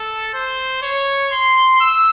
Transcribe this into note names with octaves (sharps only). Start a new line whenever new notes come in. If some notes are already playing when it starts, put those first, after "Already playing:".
Already playing: A4
C5
C#5
C6
E6